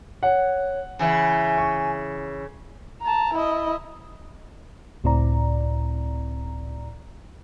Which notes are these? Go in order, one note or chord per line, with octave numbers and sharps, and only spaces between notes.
C#5 F#5
C#3 E3 G#5
C#6
A5 A#5
E4 D#5
C#2 A2 C4 E4 D5 A#5